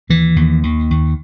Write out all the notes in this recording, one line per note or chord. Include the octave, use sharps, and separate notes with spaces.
D#2 E3
D#2
D#2
D#2